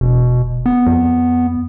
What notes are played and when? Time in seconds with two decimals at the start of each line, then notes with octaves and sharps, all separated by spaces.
0.01 E1 B2
0.66 B3
0.87 F2